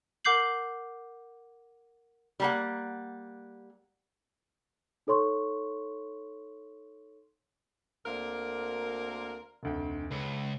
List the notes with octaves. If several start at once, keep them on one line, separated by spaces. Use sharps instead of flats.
A#4 F#5 D6 G6 C7 F#7
G3 A#3 F#5
D#4 A4 C#5 C6 C#6
D2 A#3 C4 A#4 D5 F5
F1 D2 G5
C#2 B4